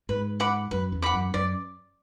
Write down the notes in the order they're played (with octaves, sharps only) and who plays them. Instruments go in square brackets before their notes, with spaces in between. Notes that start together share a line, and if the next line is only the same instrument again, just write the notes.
[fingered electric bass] G#2 [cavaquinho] B4
[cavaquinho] F#5 B5 D6
[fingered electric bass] F#2 [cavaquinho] B4
[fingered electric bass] E2
[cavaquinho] F#5 B5 D6
[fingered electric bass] F#2
[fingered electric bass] F#2 [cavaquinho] D5